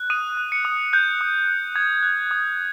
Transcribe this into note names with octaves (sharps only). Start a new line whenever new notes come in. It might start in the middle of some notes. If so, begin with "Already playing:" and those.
Already playing: F#6
D#6 D#7
F#6
C#7
D#6
F#6 G6
D#6
F#6
D#6 G#6
F#6
D#6